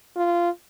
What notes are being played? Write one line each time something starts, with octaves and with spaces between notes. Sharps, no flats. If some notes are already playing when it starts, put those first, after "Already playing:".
F4